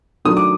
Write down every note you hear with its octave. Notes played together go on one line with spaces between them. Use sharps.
D#3 F#3 A3 D4 D#6
D6